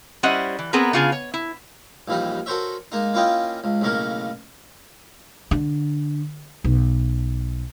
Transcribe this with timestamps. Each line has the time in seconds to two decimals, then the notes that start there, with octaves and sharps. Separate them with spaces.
0.23 G3 C#4 E4 C5 D#5 F#5
0.59 E3
0.73 B3 C4 G#4 A#4 B4 A#5
0.93 C#3 D4 F4 G#4 F5 G#5
1.12 C#5
1.34 E4
2.08 A#1 D#2 E3 G3 D#4
2.46 F#4 A4 A#4 C5 C#5 E5
2.92 G#3 A#3 D#4
3.14 A#3 C#4 E4 F4 D#5 G5
3.64 C#2
3.81 B1 A2 C#3 A#3 A#4
5.51 D3
6.64 B1